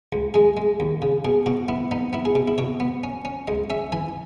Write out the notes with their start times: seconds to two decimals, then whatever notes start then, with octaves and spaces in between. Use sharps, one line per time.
0.12 C#2
0.34 G#3 G#4
0.57 G#3
0.80 D#2
1.02 C#3
1.25 B2 G#4
1.46 B2 F#4
1.68 B3 E4
1.91 B3 D#4
2.13 B3 E4
2.25 G#4
2.35 B2
2.48 E4
2.58 B2 C#5
2.80 B3
3.04 C#4
3.25 C#4
3.48 C#2 D#5
3.70 C#4 E5
3.92 E3 G#5